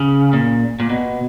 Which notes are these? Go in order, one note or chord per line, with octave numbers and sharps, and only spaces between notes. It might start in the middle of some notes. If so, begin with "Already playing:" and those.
Already playing: C#3
A#2
A#2
B2